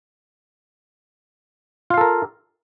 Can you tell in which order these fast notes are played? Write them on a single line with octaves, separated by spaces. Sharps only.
F4 F5 A4 A#4